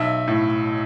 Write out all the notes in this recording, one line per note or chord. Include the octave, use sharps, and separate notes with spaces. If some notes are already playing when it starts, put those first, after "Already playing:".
Already playing: B1 E5
A2